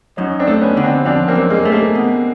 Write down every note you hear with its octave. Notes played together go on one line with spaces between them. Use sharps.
F#2 C#4 D#4
C4 D4
A3
B3 C#4
D3
C4 D4
F3 C4 D4
A#3 C4
F#2
G#3 A#3
A3
G#3 A#3
B2